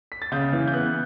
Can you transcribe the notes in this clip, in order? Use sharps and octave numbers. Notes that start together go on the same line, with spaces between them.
B6
A6
C#3 G6
E3
G6
B3 F#6